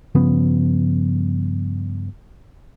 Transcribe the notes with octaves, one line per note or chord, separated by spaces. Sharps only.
G2 C#3 F3 B3